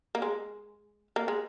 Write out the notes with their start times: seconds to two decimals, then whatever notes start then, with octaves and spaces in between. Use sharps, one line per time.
0.15 A#3
0.22 G#3
1.16 A#3
1.28 G#3